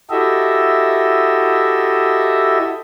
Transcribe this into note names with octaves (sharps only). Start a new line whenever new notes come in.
E4 F#4 G4 A4 D#5 E5